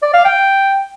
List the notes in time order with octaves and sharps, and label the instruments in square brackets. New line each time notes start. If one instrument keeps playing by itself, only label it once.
[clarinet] D5
F5
G5